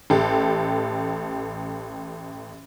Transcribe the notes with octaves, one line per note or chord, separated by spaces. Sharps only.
A1 G4 A4